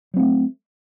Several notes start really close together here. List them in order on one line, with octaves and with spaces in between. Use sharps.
F#3 C4 A3